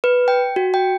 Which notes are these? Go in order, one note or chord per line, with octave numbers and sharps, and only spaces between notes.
B4
G5
F#4
G5